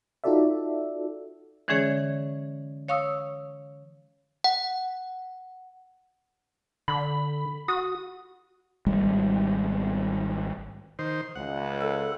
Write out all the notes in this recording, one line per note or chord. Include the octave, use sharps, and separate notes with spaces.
D#4 F4 F#4 A4 D5 E5
D3 E3 G#3 C#4 G#4 C#5
C#5 F5 C#6 D#6 E6
F#5
D3 B5
F#4 D#6
G#1 G3 G#3
D#3 C5
C#2 F#5
A4